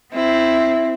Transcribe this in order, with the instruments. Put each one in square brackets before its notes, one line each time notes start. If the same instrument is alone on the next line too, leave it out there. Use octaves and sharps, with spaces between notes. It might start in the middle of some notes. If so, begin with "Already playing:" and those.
[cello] C4 [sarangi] E4